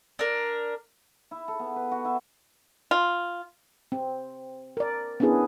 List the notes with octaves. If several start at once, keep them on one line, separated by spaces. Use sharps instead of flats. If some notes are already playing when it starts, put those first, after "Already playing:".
D4 A#4
E4
A4
B3
B4
F#4
E4
F4
C4
A#4 D5
B3 C#4 D4 E4 G#4 B4